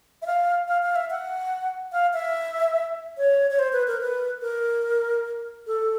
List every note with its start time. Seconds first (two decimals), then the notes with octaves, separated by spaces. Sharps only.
0.22 E5
0.26 F5
0.68 F5
0.83 F5
0.96 E5
1.10 F#5
1.92 F5
2.14 E5
3.18 C#5
3.51 C#5
3.59 C5
3.73 B4
3.87 A#4
4.01 B4
4.42 A#4
5.67 A4